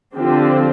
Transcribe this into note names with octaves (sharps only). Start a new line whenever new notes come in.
D3 F3 C4 G4